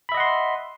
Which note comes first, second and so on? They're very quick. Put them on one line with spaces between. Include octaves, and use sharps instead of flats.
B5 E5 D#5 F#5 C6